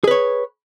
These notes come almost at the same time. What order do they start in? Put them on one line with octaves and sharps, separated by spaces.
G#4 B4 C#5